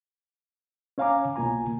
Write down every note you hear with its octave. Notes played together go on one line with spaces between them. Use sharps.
C#4 C#5 F5 G#5 A#5 D6
C2 B2 A#3 F4 G#5 A#5